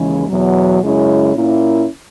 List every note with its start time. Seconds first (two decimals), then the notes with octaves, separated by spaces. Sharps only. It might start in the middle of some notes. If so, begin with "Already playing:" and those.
Already playing: D#2 C#3 E3 G#3 C#4
0.28 E2 B2 F#3
0.81 F#2 C#3 G#3 C#4 E4
1.34 A#2 A#3 C#4 E4